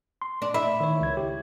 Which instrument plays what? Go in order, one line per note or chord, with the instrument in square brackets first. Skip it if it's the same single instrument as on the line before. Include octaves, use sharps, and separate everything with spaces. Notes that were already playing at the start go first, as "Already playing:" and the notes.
[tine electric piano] C6
[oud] D4
[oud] E4 [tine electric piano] B5
[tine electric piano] D#3 C#5
C#2 G#6
G4